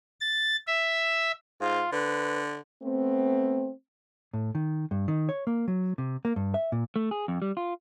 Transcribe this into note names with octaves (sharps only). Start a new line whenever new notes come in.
A6
E5
G#2 F4
D3 B4
A3 B3 C4
A2
D#3
G2
D#3
C#5
A#3
F#3
C3
A#3
G2
E5
A#2
A3
G#4
F2
G3
F4